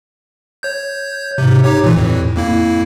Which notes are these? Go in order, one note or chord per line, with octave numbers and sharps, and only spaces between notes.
C#5 G6
G#2 C3
D#4 G4 C#5
A#2 E3
F2 A2
F2 A#3 E4